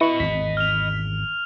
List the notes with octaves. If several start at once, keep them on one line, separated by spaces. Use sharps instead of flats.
E4 B4 D#5 B5 C#6
G#1 E2 B6
F6 F7